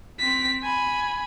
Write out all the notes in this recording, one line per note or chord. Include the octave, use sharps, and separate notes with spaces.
C4 B6
G#5 B5